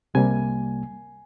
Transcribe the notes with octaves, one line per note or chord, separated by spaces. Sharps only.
C2 C3 G3 A#3 G#5